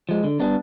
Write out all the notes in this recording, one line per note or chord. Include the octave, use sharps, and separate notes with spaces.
F3 G#3
D3
G3 B3 D4